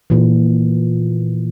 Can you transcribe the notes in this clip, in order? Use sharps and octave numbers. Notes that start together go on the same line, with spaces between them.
A#2 E3